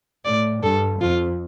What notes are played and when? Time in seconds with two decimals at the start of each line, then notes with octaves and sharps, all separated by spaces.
0.24 A2 D5
0.62 G2 A4
1.01 F2 F4